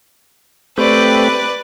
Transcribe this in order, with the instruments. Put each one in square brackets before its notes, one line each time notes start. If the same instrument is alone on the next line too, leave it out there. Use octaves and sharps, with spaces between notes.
[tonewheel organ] A3 C4 G4 [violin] B4 D5